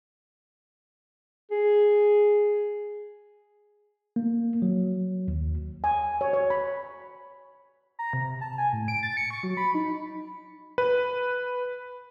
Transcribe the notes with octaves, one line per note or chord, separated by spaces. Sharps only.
G#4
A#3
F#3
D#2
G#5
C#5
C#5
B5
A#5
C3
A5
G#5
A2
D7
A6
C#7
C#6
F#3
B5
D#4
B4